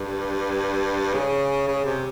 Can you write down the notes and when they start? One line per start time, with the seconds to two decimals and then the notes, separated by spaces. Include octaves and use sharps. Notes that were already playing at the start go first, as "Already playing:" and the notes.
Already playing: G2
1.14 C#3
1.67 C#3
1.85 C3